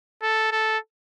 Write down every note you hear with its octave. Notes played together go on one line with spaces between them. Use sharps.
A4
A4